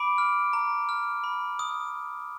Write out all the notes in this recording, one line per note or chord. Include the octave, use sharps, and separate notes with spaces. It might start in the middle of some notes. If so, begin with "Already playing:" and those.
Already playing: B5 D6 D7
F6
A#5
F6
B5
D#6